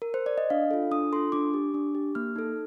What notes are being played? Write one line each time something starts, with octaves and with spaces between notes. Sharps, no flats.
A#4
C5
D5
D#5
D4 F5
F4 A4
D4 D#6
F4 A4 C6
D4 D6
G4
D4
G4
A#3 F6
D#4 A4